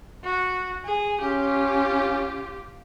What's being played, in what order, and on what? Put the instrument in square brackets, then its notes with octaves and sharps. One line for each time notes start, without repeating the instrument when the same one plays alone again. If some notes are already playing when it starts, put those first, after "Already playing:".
[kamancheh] F#4
G#4
[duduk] C#4 [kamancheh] F4 G4